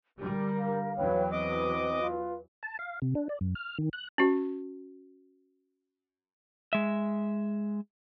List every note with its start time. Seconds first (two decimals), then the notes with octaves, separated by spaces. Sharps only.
0.17 D3 G3 A#4
0.59 F5
0.96 E2 E3 F#3 B4 C#5 G5
1.32 C4 B4 D#5 D6
2.02 F4
2.63 A5
2.79 F5
3.02 C3
3.15 D4
3.29 D5
3.41 F#2
3.55 F6
3.78 D#3
3.93 F#6
4.18 C#4 F#4
6.73 G#3 E5